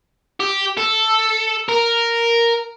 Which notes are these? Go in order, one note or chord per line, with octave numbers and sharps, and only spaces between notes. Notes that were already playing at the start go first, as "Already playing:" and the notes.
G4
A4
A#4